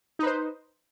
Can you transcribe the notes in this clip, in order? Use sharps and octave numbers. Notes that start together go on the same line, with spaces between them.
D#4 B4 C5